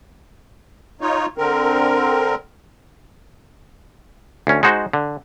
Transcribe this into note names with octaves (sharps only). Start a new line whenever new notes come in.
D#4 F4 C#5
D3 C4 A#4
D2 C#4
G#3 D#4 F#4 C5
D3